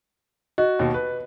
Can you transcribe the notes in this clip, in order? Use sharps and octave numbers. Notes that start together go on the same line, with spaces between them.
F#4 D#5
D#2 B2
B4